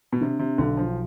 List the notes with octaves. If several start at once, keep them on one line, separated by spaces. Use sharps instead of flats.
B2
C3 D4
C3
B1 D3
F3